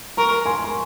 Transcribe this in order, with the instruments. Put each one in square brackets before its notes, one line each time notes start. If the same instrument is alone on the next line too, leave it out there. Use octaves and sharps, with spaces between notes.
[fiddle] A#4 [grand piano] A#5 C#6
[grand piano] G#5 C6
C6